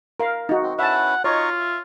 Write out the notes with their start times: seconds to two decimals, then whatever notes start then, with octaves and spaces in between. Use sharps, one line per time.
0.20 A#4 F5
0.49 D#4 F#4
0.63 C4
0.79 C#4 E4 B4 E5 F#5 A5
1.24 D#4 F4 C#5 D#5 C#6
1.60 E5